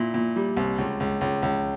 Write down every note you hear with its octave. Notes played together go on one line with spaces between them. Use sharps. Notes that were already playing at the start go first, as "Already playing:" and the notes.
Already playing: A#2 E4
A#2
G3
C2
C#2
C#2
C#2
C#2